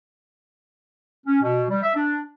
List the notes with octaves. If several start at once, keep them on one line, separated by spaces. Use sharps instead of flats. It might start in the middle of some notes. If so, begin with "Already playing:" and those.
C#4
B2
G3
E5
D4